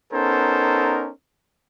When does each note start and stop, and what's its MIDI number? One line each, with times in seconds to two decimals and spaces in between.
0.13 1.11 59
0.13 1.11 61
0.13 1.11 63
0.13 1.11 69
0.13 1.11 70
0.13 1.11 72